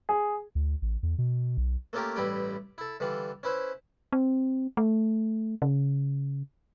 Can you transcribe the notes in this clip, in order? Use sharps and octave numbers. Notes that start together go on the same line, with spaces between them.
G#4
D2
A1
E2
B2
B1
A3 A#3 C#4 F4 G4 A#4
A1 G2 G3 E4 G4 G5
E4 A4
D3 E3 G3 F4
C#4 E4 B4 C5
C4
A3
C#3